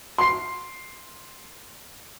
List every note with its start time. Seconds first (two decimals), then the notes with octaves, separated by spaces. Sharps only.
0.18 C6 C7